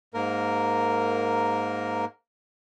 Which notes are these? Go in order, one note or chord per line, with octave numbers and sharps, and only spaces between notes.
G#2 A#3 A#4